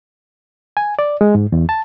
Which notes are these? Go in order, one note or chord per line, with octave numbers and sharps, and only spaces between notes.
G#5
D5
G#3
G#2
E2
A5